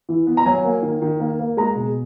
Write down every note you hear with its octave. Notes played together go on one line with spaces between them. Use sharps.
E3
B3
A#5
F#3 G#5
A#3
D#3
D#3
A#3
A#3
G#3 A#5
B2